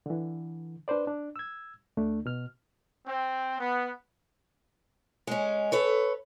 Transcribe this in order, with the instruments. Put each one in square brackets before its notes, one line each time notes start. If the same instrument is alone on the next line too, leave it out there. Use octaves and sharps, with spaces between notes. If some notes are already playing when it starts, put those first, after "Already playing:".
[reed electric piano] D3 E3
D4 B4 C5 D5
D4
E6 G#6
D2 A3 D4
B2 F6
[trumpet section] C4
B3
[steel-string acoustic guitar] G#3 C#4
A4 B4 C#5